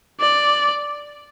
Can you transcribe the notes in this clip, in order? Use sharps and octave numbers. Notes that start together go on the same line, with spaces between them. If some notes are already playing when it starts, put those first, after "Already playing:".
D5